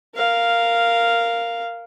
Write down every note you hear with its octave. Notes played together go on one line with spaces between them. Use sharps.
A#4 F5